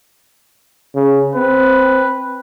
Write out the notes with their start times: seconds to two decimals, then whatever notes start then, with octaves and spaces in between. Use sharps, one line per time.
0.95 C#3
1.35 C4 B4